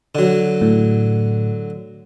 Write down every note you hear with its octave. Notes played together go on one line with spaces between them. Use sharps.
D3 F#3
A2